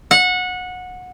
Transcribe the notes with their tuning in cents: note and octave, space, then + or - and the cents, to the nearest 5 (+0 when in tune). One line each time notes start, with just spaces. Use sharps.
F#5 -20